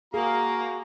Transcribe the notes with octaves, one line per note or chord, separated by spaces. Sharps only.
A#3 F#4 G#4 A#5